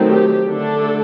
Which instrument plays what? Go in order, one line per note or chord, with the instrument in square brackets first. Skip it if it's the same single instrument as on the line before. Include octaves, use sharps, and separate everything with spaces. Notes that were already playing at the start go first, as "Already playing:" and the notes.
Already playing: [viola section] D#3 F#3 A3 C4
G4
D3 A3 D4 A4